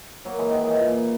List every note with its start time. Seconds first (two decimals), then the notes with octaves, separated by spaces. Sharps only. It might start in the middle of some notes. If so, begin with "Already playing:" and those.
0.25 F#3 A#3
0.39 E3 G#3
0.51 D#3 F#3
0.63 E3 G#3
0.77 A#2